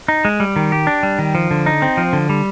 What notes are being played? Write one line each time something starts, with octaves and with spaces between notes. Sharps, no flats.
D#4
G#3
G3
D#3
G4
D4
G3
D#3
F3
D3
D#4
C4
F3
D3
G3